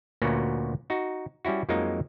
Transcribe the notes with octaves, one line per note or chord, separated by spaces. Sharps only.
D2 A#2 A#3 B3 C#4 F#4
D#4 F#4
G3 C#4 E4 F#4
F2 F3 F#3 G#3 A#3 D#4